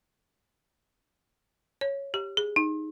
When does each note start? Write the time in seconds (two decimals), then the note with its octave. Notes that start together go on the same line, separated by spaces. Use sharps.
1.81 C#5
2.14 G4
2.37 G#4
2.56 D#4